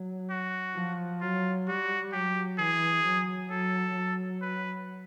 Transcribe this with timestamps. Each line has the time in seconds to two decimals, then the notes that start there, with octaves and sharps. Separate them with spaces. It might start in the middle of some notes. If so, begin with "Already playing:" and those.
Already playing: F#3
0.30 F#4
0.75 F3
1.21 F#3 F4
1.67 G3 F#4
2.12 F#3 G4
2.58 E3 G#4
3.05 F#3
3.50 F#3 A4
3.95 F#3
4.42 B4